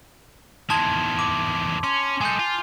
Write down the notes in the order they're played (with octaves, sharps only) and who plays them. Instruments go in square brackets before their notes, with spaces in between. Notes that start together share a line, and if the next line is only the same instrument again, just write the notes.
[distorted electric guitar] E2 D#3 [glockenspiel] A5 C6 G#6
[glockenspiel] D6
[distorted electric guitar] C#4 [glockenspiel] C6
[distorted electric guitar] G#3 A4 [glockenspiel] G#5 G6
[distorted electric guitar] F4